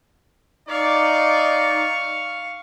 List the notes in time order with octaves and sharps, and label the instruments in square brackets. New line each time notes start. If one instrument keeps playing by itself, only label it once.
[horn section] D#4 D5 [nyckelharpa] F5 C#6